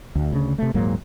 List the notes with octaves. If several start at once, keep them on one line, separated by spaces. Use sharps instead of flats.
D2
D2 C#3 D4
C3 A3
D#1 G#2 F#3 A#3